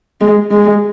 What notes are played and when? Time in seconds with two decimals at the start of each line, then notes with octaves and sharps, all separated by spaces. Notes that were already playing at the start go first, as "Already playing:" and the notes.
0.21 G#3
0.51 G#3